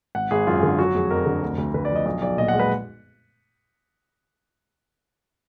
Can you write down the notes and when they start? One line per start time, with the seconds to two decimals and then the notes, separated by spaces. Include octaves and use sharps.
0.15 G#1 F#5
0.31 G#1 G#4
0.47 F#2 F4
0.63 D3
0.79 F#3 F#4
0.94 F1 G#4
1.11 F2 A#4
1.26 D3
1.42 D2
1.58 D2
1.74 D3 B4
1.85 D5
1.90 F3
1.96 D#5
2.06 B1 D#5
2.22 B1 D5
2.38 A#2 D#5
2.48 F#5
2.54 G#3
2.59 B4